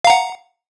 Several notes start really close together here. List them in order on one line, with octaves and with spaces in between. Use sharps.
F5 A#5 F#5